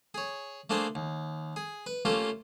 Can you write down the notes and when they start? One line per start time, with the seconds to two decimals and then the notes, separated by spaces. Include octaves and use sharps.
0.14 G#4 C#5
0.70 A3 A#3 D4 G#4 C5
0.95 D#2
1.56 G#4
1.86 B4
2.05 A3 A#3 C#4 F4 G4 A4